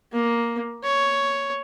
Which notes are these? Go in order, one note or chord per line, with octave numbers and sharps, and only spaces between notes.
A#3
C#5